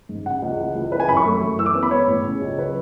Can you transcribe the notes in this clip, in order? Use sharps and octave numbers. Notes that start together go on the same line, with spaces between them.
G#2
C#3 F#5
C#2
E3
C#2
E3 B4
G#5
F#2 B5
C#6
A3
F#2
E3 E6
D6
B3
B5
G#3 C#5
A2
C#3
C#2
F#3 B4